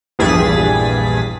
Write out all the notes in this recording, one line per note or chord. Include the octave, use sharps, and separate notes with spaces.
A#1 E2 G2 G#4 A6 B6